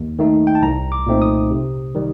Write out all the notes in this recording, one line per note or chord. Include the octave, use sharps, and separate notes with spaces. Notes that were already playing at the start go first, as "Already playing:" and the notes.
Already playing: D#2
D#3 A3 D#4
G5
A5
C2 A#5
D6
A#2 A3 C4 D#4
D#6
C3
D#3 G3